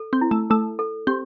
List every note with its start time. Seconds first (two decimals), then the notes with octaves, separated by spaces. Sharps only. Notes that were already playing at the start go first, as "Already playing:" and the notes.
Already playing: A4
0.13 C4
0.21 E4
0.31 A3
0.50 A3 A4
0.79 A4
1.07 C4 G4